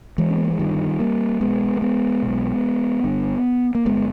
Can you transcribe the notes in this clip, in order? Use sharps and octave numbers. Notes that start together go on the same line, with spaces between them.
E3 G#3
C#4
B3
A#3
G#3
G1 G2 D#3 G3
G3 A#3
B1 B2 G#3 B3
A#3
G#3 B3
B1 B2
G1 G2
A#3
G1 G#3 B3